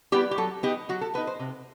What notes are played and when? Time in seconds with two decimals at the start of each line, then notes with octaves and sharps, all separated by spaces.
0.12 G3 B3 E4 G4
0.31 G4
0.38 F#3 A4
0.63 B3 D#4 G4
0.89 F#3 F#4
1.01 A4
1.14 B3 D#4 B4
1.27 C5
1.40 C3